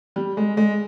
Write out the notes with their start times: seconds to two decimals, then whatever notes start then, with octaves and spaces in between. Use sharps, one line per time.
0.16 G3
0.37 G#3
0.57 G#3